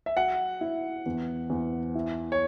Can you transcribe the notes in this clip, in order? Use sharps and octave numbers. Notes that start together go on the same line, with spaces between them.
E5
F#3 F#5
E4
E2
E2
E4
C#5